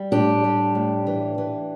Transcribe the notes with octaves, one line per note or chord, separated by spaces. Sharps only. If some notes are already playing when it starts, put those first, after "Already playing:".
Already playing: G3
A2 D4 G4
G3
A2
E3
E3